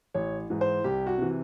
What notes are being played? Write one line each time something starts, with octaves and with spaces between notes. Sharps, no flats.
A1 C#5
G#2 E3
C5
C2 G4
F#4
C3 E3